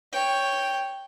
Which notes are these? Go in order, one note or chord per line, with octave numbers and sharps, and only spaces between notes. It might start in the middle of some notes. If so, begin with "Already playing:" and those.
C#5 G5